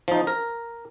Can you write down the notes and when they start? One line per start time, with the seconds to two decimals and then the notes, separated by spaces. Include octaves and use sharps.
0.08 F3 D#4
0.27 A#4